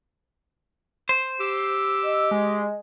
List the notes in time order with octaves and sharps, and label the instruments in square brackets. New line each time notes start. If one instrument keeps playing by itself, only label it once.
[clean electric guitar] C5
[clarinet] G4 [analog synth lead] E6
[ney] D#5
[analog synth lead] G#3